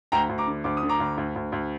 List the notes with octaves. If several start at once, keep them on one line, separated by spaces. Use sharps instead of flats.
D2 G5 A#5
D2
A#5 D6
D3
D2 D6
D#6
D3
A#5 D6
D2
D2
D2
D2